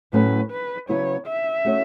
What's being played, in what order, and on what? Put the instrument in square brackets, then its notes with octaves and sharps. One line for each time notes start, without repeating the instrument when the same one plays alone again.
[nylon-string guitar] A2 F#3 A3 C#4 [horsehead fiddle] B4
[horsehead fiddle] B4
[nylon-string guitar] C#3 F#3 B3 E4 B4 [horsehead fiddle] C#5
[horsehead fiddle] E5
[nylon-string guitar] A3 C#4 F#4 C#5